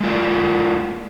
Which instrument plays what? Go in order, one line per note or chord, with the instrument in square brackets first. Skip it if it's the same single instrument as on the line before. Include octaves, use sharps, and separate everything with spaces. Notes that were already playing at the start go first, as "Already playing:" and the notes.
[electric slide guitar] G#3 A#3 F4 D5